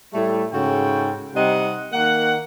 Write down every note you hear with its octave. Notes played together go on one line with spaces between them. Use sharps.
A2 G3 A3
G#2 C#3 F#4 A4 G5
C3 G3 D#4 D#5 F#5
D#3 A#3 F#5